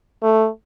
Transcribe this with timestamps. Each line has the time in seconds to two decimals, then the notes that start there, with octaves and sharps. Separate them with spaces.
0.22 A3